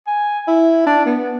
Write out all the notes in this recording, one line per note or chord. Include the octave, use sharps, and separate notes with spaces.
G#5
E4
D4
B3